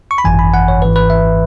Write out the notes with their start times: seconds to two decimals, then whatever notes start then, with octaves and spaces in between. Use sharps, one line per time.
0.11 C#6
0.18 B5
0.24 G#1 F#2 E3 G#5
0.39 B5
0.54 F#5
0.68 C#5
0.82 G#1 G#2 E3 B4
0.96 B4
1.10 E5